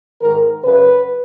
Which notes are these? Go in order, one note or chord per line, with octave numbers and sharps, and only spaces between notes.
G#2 D#3 A#4
F#2 C#3 B4